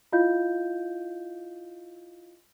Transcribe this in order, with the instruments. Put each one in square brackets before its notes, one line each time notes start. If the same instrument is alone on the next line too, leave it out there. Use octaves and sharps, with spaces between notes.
[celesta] E4 F4 D#5 F5 G6